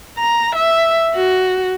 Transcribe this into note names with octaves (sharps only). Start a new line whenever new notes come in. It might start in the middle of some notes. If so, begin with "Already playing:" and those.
A#5
E5
F#4